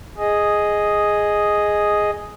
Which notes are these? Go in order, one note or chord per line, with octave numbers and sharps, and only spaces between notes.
G#4 D#5